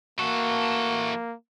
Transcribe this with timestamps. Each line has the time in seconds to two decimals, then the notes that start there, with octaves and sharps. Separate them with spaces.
0.19 E3 A#3 F#4 A4